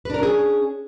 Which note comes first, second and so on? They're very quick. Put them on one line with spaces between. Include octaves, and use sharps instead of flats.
B4 D4 A#4 C#4 G#4